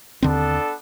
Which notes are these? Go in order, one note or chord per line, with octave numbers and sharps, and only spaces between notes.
D#2 D3 B3 C4 D4 A4